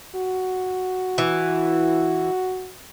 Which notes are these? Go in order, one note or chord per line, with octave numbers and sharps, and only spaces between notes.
F#4
E3